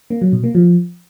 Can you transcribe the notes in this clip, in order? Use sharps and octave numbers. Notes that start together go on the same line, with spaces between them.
A#3
F#3
B2
A#3
F3